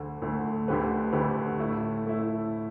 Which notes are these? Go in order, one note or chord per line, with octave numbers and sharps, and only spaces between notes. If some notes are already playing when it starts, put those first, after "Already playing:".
Already playing: D2 D3 A3
D2 D3 A3
D2 D3 A3 G4 B4
D2 D3 A3 G4 B4
A2 A3 E4
A2 A3 E4